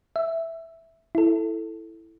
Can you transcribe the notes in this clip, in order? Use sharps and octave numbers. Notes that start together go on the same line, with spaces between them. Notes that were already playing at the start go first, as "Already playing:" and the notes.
E5
E4 A4